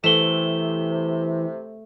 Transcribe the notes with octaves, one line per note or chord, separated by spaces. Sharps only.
C3 E3 A3 E7 G7